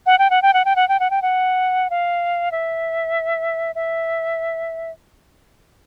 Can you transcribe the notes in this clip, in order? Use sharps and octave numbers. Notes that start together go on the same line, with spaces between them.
F#5
G5
F#5
G5
F#5
G5
F#5
G5
F#5
G5
F#5
F5
E5
E5